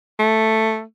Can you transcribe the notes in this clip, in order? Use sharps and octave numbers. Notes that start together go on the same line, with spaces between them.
A3